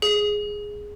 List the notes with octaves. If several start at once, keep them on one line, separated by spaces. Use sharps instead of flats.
G#4